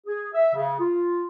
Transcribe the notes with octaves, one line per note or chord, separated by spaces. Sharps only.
G#4
E5
C#3
F4